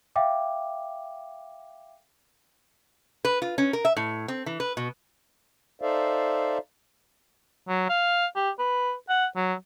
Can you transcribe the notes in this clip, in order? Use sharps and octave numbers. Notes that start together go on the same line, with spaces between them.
E5 F5 G5 D6
B4
F4
C#4
A#4
E5
A2
C4
E3
B4
B2
D#4 A4 C5 D5 E5 F5
F#3
F5
G4
B4
F#5
F#3